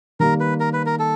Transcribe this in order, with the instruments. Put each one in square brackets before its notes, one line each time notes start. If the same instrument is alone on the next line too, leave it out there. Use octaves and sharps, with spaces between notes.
[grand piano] D#3 G3 A#3 [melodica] A#4
[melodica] B4
A#4
B4
A#4
A4